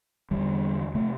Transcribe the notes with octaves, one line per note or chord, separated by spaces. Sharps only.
E2 D3 G3
C3 A3